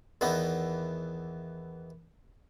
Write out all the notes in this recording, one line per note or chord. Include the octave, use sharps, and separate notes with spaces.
E2 D#3 E3 B3 D#4